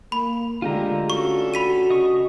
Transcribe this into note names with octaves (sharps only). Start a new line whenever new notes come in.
A#3 B5
D3 G#3 A3 F4 G4 A#5
C#4 D4 F#4 A4 C#6
F#4 B5 B6 D#7
C#3 D#5 C#6